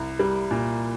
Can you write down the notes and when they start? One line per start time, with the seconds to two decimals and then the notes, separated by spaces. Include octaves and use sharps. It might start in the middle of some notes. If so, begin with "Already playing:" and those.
Already playing: C2
0.19 G3
0.51 A#2